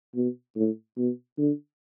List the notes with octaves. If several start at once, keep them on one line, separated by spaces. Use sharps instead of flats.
B2
A2
B2
D3